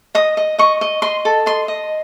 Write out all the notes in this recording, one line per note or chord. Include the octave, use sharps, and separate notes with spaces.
D#5 D#6
D#5
D#5 C#6
D#5
D#5 C6
A4
D#5 C6
D#5